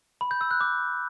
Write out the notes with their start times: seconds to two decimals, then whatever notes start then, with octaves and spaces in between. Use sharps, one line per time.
0.21 B5
0.31 G6
0.41 E6
0.51 F#6
0.61 D6